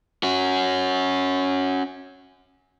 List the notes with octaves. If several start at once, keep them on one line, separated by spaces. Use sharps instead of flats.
C#4 F#4